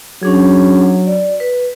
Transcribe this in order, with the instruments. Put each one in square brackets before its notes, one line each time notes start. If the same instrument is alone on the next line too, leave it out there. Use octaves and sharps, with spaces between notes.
[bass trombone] F#3 [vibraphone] C#4 D4 G#4
[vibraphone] D5
B4